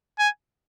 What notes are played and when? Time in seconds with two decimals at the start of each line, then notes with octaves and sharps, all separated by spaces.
0.19 G#5